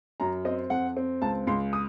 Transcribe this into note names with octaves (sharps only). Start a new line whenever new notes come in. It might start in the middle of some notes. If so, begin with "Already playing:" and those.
F#2 A#5
C4 D#5
F2 F#5
C4
C#2 A5
C#2 C6
D#6